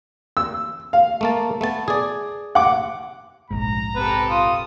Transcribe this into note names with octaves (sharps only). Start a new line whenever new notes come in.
E6
F5
A3 A#3 A5
A3 B3 A5
G#4 D5
F#5 D6
F1 A#1 G#2 A#5
C4 G4 A4 B4
F4 D#6